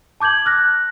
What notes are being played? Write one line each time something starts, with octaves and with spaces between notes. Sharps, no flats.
A5 D6 G6 G#6 F#7
F6 F#6 A#6